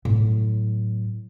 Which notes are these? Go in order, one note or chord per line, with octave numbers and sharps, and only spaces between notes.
A2 F#3